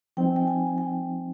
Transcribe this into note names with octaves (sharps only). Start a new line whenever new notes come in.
F3 C4 D#4 G5
G#5
G5
G#5
G#5
G5